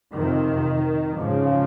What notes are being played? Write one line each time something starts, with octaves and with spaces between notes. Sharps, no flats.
F2 C3 D#3
G#2 C#3 F3